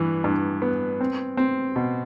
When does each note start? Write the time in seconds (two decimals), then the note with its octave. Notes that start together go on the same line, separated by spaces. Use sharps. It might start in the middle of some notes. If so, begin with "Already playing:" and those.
Already playing: G2 E3
0.24 G2
0.62 B3
1.01 C4
1.37 C4
1.76 B2